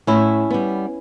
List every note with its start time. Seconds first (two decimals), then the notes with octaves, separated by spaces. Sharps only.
0.07 A2 C#4 E4
0.50 G3 B3